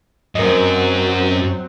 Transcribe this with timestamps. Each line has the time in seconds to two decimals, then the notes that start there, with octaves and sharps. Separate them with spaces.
0.35 F#2 F#3 C4 A#4 D#5